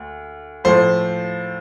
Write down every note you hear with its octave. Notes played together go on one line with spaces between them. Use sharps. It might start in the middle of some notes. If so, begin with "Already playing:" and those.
Already playing: D2
A2 F3 A3 C5